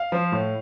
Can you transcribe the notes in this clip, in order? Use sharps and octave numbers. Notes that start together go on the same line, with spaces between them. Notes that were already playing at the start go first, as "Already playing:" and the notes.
Already playing: F5
F3
A2